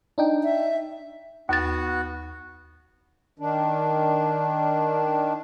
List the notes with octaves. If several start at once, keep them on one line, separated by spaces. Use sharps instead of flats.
D4 D#4 G5
E5
D#2 B3 F#4 A6
D#3 D4